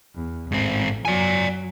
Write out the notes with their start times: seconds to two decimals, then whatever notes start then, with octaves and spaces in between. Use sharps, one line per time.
0.15 E2
0.52 A1 G#2 C4
1.05 F#2 F#3 D5 G#5